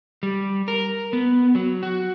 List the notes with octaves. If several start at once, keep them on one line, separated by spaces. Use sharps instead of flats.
G3
A#4
B3
F#3
F#4